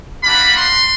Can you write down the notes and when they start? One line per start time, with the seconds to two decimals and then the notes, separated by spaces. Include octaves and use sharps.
0.23 A#3 D4 F#4 B5
0.56 C6